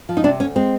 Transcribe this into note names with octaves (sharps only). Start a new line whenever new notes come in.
F3
D#4
C3 D4
D2 C#4
G#3 C4